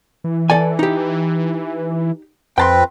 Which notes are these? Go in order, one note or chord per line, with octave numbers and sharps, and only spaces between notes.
E3
A4 D5 G#5
D#4 G4
F2 C4 B4 G5 A5 C6